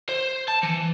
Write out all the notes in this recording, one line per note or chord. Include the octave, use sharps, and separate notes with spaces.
C5
A5
E3